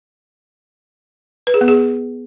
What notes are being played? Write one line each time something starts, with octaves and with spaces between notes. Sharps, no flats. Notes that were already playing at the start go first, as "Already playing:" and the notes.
B4
G#4
B3
G#4